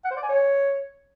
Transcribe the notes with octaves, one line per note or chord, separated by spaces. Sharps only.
F#5
C5
D5
G#5
C#5